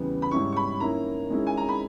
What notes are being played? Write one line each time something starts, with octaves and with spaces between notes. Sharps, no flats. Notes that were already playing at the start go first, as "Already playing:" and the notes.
Already playing: E2 C#3 G3 B3
B5
G#2 G3 C#4 E4 C#6
C#6
B5
D#3 A#3 C#4 E4 A#5
D#3 G#3 C#4 E4
G#5
A#5
B5